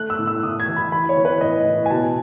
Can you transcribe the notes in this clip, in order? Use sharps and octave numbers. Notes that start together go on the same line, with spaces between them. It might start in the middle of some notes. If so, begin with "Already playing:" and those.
Already playing: A3 F#6
E6
A2
E6
A2 D#6
G#6
E3
B5
E3 B5
C#5
E3
B4
A2 D#5
A2
G#5
B2 A5